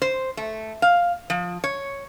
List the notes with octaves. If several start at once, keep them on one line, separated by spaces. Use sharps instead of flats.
C5
A3
F5
F3
C#5